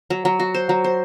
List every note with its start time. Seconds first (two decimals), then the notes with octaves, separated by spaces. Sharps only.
0.10 F#3
0.25 F#3
0.39 F#4
0.54 C5
0.69 F#3
0.84 C5